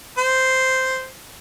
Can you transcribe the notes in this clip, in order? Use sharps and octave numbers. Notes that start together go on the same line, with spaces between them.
C5